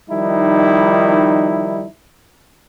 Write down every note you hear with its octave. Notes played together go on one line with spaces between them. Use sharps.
D#3 F3 G3 D#4 E4